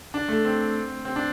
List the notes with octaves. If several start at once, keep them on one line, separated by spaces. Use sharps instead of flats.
D4
A3
C4
C4
D4